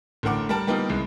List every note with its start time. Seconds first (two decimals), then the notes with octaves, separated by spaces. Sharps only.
0.23 A1 D3 A#4 F#5 D6
0.49 G3 A#4 A5
0.67 G3 A#3 B3 D#4 F4
0.89 C2 G#3